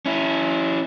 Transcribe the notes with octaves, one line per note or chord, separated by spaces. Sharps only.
C#4 E4